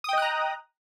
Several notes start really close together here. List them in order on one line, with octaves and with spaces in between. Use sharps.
D#6 G5 D#5 F#6 A#5